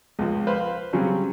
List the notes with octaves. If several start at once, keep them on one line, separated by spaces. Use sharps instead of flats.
C#2 F3
B4 C5 F5
C#3 F#3 G3 C4 C#4